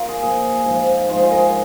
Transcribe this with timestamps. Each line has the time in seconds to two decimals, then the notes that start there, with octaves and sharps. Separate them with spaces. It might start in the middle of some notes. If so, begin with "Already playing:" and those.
Already playing: F4 A#4
0.09 G#4
0.22 A#2 F3 G#4
0.65 G#2 F3
1.09 G#2 F3 F4
1.17 G#4
1.22 F4
1.31 A#4
1.38 G#4